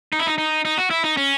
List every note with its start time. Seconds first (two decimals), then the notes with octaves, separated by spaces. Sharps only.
0.13 D#4
0.20 E4
0.27 D#4
0.38 D#4
0.65 D#4
0.78 F#4
0.90 E4
1.04 D#4
1.17 C#4